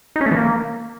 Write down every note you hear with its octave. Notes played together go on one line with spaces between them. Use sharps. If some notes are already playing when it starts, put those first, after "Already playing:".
D#4
C#4
A3
E3
A#3